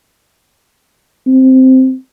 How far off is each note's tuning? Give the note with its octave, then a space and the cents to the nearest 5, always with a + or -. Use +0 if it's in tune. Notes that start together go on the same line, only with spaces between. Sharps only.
C4 -5